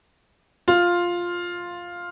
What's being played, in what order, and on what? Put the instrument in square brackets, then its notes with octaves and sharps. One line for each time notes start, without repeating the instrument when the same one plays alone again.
[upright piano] F4